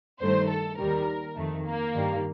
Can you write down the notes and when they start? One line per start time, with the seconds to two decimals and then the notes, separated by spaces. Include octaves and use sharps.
0.21 G2 D#3 A3 C5
0.49 A4
0.78 D#2 D#3 G3 A#4
1.36 F2 D#3 A3
1.65 A#3
1.94 G2 D#3 G3